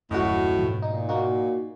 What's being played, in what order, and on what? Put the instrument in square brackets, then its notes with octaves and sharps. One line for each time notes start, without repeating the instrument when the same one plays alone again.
[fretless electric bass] D#1 F#2 [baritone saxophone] A2 [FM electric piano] F#4 D#5
[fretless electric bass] G#2 B2 F3
[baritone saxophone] A#2 [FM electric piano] D#4
[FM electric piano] A#3 D#4 F#4